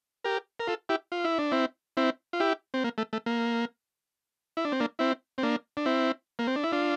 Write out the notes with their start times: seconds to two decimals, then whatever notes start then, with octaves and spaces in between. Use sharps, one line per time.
0.24 G4 A#4
0.60 A#4
0.67 F4 A4
0.89 E4 G4
1.12 F4
1.24 E4
1.38 D4
1.52 C4 E4
1.97 C4 E4
2.33 F4
2.40 E4 G4
2.74 C4
2.84 A#3
2.98 A3
3.13 A3
3.26 A#3
4.57 E4
4.65 D4
4.72 C4
4.80 A#3 D4
4.99 C4 E4
5.38 C4
5.43 A#3 D4
5.77 D4
5.86 C4 E4
6.39 A#3
6.47 C4
6.56 D4
6.64 E4
6.72 D4 F4